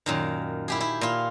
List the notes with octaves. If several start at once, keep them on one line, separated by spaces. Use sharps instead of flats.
F#2 A#2 D#3
E4 G4 G#4
E4
A#2 F4